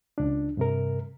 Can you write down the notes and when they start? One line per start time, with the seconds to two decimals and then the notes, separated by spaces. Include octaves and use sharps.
0.18 C#2 D4
0.57 G2 C3 A#4